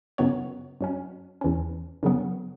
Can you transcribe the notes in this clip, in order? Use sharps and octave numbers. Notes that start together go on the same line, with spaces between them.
F#2 C#3 F#3 B3 C#5
F#2 F#3 C#4
E2 E3 C#4
F#2 C#3 F#3 B3